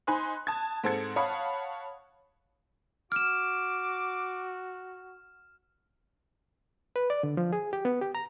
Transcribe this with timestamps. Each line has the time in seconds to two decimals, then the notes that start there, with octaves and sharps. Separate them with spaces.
0.07 D#4 C5 G#5 B5 C6 F#6
0.47 A5 D#6 G#6
0.84 G#2 C4 A4 G#6 C#7
1.16 C#5 F5 F#5 A5 B5 D#6
3.12 F#4 D6 F6 E7
6.96 B4
7.10 D5
7.23 D3
7.37 F3
7.53 G#4
7.73 G4
7.85 B3
8.02 G4
8.15 A#5